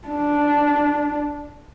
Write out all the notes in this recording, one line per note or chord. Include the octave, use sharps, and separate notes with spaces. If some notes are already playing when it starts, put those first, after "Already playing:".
D4